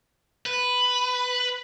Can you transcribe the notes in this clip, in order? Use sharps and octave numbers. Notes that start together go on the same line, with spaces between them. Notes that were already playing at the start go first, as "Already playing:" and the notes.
B4